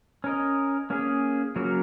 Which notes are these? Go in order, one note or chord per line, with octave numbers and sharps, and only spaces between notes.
C#4 A#4 D#5
A#3 C#4 G#4
C#3 F#3 A#3 F#4 A#4